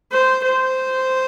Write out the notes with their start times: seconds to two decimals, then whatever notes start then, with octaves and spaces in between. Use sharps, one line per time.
0.12 C5
0.44 C5